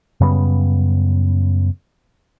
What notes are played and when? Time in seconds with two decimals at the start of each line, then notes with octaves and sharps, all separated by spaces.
0.20 F#2 C#3 G3 B3